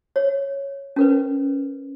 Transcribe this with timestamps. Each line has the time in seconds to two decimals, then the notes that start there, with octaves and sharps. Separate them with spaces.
0.16 C#5
0.96 C#4 A#4 B4